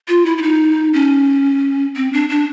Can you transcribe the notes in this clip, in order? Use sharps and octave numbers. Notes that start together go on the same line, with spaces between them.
F4
E4
E4
D#4
C#4
C4
D4
D4